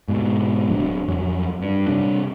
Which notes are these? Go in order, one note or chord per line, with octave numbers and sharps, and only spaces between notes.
G#2 B2
D1 F#3 D4
F2 F#3
G2
C3 G3 D4